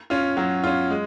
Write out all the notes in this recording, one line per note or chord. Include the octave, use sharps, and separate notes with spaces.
C#4 F4
F#3
C#4 F4
G#3